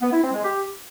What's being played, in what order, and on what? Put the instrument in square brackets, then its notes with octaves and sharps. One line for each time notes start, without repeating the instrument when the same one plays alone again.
[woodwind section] B3
E4
C4
G#3
G4